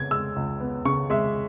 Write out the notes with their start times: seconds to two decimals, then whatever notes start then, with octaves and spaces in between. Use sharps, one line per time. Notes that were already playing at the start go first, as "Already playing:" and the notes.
Already playing: C#3 B3 G#6
0.11 G#3 E6
0.36 C#2
0.60 B3
0.85 C#3 C#6
1.10 G#3 E5